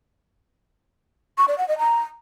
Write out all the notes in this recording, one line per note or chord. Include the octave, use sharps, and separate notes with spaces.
C#6
D5
F#5
D#5
A#5